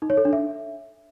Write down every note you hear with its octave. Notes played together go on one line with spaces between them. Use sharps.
D#4
C#5
A4
D4
E5